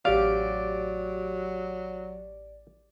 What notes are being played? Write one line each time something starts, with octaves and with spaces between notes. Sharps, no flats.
A1 F#3 G4 D5 F5 D7